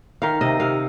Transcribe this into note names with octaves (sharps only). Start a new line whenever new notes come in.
D#3 F5
C3 D#5
C3 F5